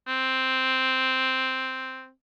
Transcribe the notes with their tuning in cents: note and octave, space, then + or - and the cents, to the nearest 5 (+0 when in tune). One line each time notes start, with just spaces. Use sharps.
C4 -5